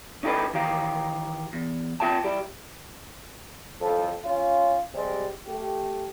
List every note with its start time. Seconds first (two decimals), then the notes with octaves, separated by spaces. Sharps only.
0.23 C#4 D#4 E4 G4 A4 B4
0.54 D#3 E3 G4 F5
1.53 E2
2.00 C4 F4 E5 G5 A5
2.24 G3 E4 G4
3.81 F2 A2 A4
4.24 C#4 F4
4.94 C3 G3 G#3
5.47 A3 G4